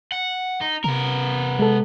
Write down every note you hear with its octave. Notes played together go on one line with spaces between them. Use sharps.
F#5
D#4
C3 B3 A#4
G#3 A4